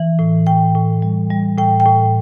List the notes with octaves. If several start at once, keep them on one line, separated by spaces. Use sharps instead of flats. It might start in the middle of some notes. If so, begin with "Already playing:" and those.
Already playing: E3
A2
A2 G5
A2
G3
G3
A2 G5
G5
A2